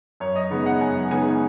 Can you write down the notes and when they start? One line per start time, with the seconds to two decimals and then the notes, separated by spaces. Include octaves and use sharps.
0.20 F#2 C#5
0.36 D#5
0.50 C#3 G#3 B3 D#4
0.66 F#5
0.81 F#2 G#5
1.11 C#3 G#3 B3 D#4 G#5